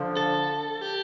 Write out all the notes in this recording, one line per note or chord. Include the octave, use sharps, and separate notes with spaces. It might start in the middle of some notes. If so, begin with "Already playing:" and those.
Already playing: D3 F3
A4
G4